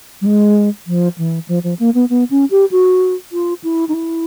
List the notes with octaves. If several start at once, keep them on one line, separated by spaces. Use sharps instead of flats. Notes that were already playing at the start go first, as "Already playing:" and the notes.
G3
G#3
F3
E3
F3
F3
A#3
B3
B3
C#4
G4
F#4
F4
E4
D#4
E4